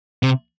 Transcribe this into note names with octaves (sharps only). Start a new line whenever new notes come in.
C3